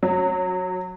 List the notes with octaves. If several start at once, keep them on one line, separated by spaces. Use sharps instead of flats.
F#3